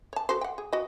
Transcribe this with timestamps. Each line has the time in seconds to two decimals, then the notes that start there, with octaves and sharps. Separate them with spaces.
0.13 C#5 A5
0.29 F#4 A4 C5
0.41 F#5 G5
0.58 G#4
0.73 F#4 D#5